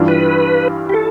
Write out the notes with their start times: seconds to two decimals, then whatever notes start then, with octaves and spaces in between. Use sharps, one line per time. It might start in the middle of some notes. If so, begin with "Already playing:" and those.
Already playing: G2 E3 G3 D4 F4
0.08 B4
0.89 G4
0.94 A4